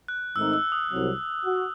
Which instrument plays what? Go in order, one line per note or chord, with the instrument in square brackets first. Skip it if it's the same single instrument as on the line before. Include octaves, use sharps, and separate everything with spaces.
[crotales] F#6
[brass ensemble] G#2 D#3 A3 C4 D#4 [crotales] E6
[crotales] E6
D#6
[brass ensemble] C2 C3 F#3
F#4